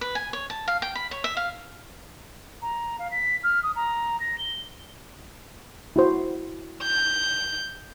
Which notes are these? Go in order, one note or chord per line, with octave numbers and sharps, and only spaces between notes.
B4
G#5
C#5
A5
F5
G5
B5
C#5
E5
F5
A#5
F5
B6
F6
D#6
A#5
A#6
G7
E4 F#4 C5
G6